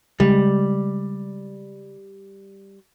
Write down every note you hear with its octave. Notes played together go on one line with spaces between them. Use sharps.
C#3 G3 G#3